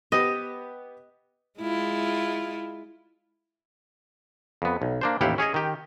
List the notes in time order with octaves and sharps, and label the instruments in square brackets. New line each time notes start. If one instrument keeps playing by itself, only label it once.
[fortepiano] B3 G4 [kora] D#5
[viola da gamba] G#3 E4 F4
[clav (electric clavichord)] F2 B3
B1
A#3 D4 C5
A1 D#2 E4 G4 F5 F#5
C#4 G#4 C#5 D#5
D#3 G4